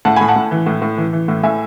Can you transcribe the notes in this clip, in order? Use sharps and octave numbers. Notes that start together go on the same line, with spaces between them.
A2 F#5 A5
A2 G#5 B5
F#5 A5
A2
E3
A2
A2
E3
E3
A2
A2 E5 G#5